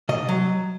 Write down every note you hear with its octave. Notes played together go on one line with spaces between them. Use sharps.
C3 D#5
F#3